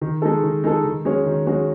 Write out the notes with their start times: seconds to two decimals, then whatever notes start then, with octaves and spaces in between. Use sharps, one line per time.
0.01 D#3
0.22 G#3 D#4 A4
0.43 D#3
0.64 G#3 D#4 A4
0.85 D#3
1.05 G#3 C#4 F#4
1.26 D#3
1.47 G#3 C#4 F#4